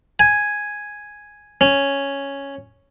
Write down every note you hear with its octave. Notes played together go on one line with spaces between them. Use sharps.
G#5
C#4